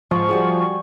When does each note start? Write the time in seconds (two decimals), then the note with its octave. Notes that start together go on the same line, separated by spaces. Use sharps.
0.11 G#2 F3 C#6
0.29 G3 F#4 G#4